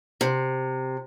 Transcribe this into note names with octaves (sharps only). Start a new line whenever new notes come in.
C3